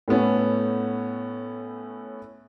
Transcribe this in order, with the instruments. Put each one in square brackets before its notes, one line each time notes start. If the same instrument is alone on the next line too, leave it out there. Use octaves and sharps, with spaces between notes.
[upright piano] A2 A3 B3 C#4